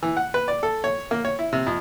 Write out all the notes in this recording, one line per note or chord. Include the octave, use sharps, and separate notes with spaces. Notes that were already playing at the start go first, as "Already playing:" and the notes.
E3
F#5
B4
D5
A4
C#5
A#3
C#5
E4
C3
F2